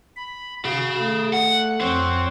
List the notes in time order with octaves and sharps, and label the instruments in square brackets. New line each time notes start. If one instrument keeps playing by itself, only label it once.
[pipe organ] B5
[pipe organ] F#4 [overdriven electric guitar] G#4 F5
[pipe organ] A3
[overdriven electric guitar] F#5
[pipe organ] F2 C#5 F#5 [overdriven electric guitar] C4